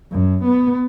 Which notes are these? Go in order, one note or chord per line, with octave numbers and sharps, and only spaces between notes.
F#2
B3